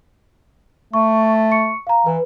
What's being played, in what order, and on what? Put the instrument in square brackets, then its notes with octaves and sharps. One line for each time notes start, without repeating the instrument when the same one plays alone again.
[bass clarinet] A3 [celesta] C#6
[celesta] C#6 C#7
F5 A#5
[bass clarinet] E3 [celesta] B4